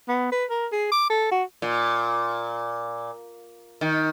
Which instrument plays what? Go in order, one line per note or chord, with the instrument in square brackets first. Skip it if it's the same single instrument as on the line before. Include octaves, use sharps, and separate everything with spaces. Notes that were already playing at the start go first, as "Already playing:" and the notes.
[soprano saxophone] B3
B4
A#4
G#4
D6
A4
F#4
[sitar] A#2
D#3